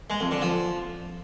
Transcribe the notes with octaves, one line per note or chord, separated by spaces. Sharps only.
G#3
F2
D3
F3